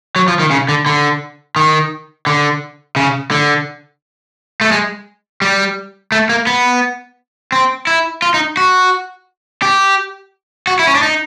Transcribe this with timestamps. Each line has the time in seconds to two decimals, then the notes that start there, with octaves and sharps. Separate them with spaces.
0.16 F#3
0.28 F3
0.39 D#3
0.51 C#3
0.69 D3
0.86 D3
1.56 D#3
2.27 D3
2.96 C#3
3.31 D3
4.61 A3
4.72 G#3
5.42 G3
6.12 A3
6.29 A#3
6.47 B3
7.52 C4
7.87 E4
8.22 F4
8.34 D#4
8.57 F#4
9.62 G4
10.67 F#4
10.79 E4
10.87 C#4
10.95 D4
11.03 D#4